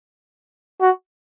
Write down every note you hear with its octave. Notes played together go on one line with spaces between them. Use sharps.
F#4